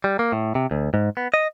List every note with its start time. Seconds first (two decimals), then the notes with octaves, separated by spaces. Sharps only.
0.04 G3
0.19 A#3
0.32 A2
0.55 C3
0.71 D2
0.94 G#2
1.17 B3
1.34 D#5